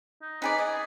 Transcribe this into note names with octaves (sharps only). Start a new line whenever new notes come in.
D#4
D#4 G#4 B4 D5
G#4 D#5